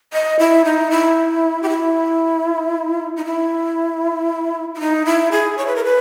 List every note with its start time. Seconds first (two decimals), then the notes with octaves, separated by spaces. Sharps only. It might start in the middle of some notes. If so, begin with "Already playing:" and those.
0.13 D#5
0.39 E4
0.65 D#4
0.91 E4
1.63 G4
1.69 E4
3.17 D#4
3.25 E4
4.75 E4
4.80 D#4
5.06 E4
5.32 G#4
5.58 C#5
5.67 B4
5.76 A#4
5.84 B4